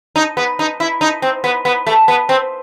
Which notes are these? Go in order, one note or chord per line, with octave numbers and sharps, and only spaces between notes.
D#4
B3
D#4
E4
D#4
C4
B3
B3
A3
B3
C4